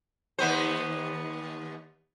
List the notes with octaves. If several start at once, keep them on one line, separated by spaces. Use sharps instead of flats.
D#2 B3 C5